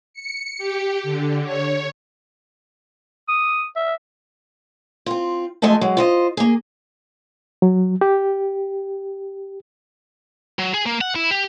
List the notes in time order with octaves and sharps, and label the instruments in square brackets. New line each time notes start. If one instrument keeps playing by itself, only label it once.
[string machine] C#7
G4
D3
C#5
[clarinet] D#6
E5
[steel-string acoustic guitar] C4 F4
F2 G#3 A3 D#5 G#5 A5
F#3 G#3
F4 C5 D#5
A#3 G#4
[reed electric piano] F#3
G4
[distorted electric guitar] F#3
G#4
A#3
F#5
E4
G4